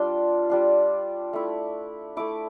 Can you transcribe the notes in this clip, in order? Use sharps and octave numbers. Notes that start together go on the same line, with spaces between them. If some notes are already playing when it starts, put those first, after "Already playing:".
Already playing: G3 D4 F4 C6
G3 D4 F4
A3 E4
A3 E4 D6